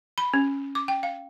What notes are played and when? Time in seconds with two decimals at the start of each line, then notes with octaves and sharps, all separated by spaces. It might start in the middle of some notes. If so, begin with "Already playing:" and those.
0.18 B5
0.34 C#4
0.75 D6
0.88 G5
1.03 F5